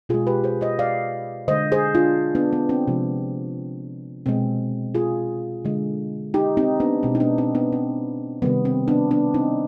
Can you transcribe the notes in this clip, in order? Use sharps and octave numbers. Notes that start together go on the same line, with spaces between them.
B2 G#3 F4 G#4
G4 B4
G#4 C5
C5 D#5
D5 F5
D3 G#3 C5 D#5
G#4 C5
D4 F4
B3 D4
B3
C4
C3 F3 G#3
B2 G#3 C4
F4 G#4
D3 G#3
D#4 G4
C4 D#4
B3 D4
B2 G#3 C4
D#4
B3 D4
C4 D#4
B3 D4
C4
C3 D#3 G3 B3
C4
B3 D4
B3 D4
C4 D#4